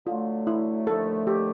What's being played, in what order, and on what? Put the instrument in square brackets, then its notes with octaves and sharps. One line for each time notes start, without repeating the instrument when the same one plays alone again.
[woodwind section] D3 F#3 A3 [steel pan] F4
[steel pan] E4
[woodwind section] D#2 D3 F3 A3 [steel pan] A4
[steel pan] G4